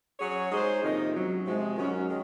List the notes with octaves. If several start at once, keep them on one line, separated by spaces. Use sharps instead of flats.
F#3 C#4 G#4 C#5
G#3 D#4 G#4 C5
F2 C3 D#3 A#3 D#4
G#2 F#3 C#4
C3 F3 G#3
F#2 D#3 F#3 C#4
D#3 G#3